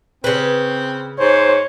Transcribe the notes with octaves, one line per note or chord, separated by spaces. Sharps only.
C#3 C4 B4
G#2 C5 C#5